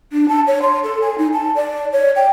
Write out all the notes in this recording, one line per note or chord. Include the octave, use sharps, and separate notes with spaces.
D4
A5
C#5
C6
A4
G#5
D#4
A5
D5
C#5
G5